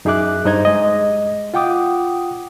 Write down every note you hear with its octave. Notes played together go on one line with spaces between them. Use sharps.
F#2 D#4 G#4 E5 D6 F#6
G2 D#4 C5 D#5 A#5 G#6
G#3 D#5
F4 F#5 G5 D6 D#6